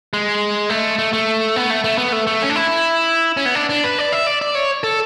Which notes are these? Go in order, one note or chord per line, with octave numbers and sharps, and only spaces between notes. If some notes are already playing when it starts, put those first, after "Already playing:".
G#3
A3
A3
A3
B3
A3
A3
B3
A3
A3
C#4
D4
E4
C#4
B3
D4
D4
B4
D5
E5
D5
D5
C#5
A4